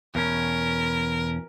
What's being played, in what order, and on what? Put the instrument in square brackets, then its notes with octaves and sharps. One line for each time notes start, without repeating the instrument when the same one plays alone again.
[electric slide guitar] E2 B2 C#4 [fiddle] A#4